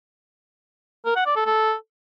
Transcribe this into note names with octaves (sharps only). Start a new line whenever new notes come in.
A#4
F#5
D5
A4
A4